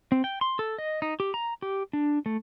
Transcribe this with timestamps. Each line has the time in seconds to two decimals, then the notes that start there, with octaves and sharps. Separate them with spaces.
0.12 C4
0.24 G5
0.41 C6
0.59 A4
0.78 D#5
1.02 D#4
1.20 G4
1.34 A#5
1.62 G4
1.93 D4
2.26 A3